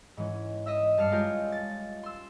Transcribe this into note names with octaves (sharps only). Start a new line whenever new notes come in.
G#2 E3 C#4
D#5 E5 E6
G2 A5 F6 C7 C#7
G#3 C#4 F4 G4 A#4
A6
C6 E6